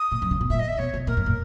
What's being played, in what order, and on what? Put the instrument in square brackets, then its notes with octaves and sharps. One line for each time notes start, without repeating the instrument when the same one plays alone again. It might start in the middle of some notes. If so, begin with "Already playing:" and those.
Already playing: [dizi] D#6
[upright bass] A#2
F#2
C#3
B2
[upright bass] A#2 [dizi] E5
[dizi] D#5
E5
[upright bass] B2 [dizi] C#5
[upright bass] B2
[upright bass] A#2 [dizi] A#4
[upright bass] F#2
A#2